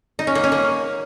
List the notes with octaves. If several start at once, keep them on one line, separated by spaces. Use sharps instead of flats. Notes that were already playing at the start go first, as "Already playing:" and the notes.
D#4
C#4
A#3
C#4
A#3